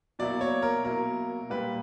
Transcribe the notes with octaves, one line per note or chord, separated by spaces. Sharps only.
B2 F#3 A#3 E4 D5
C#5
A#4
B2 F#3 A#3 E4 A#4
A#2 G3 A#3 B4